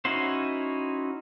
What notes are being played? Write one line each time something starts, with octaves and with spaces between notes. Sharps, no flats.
C#4 D#4 E4 F#4 C5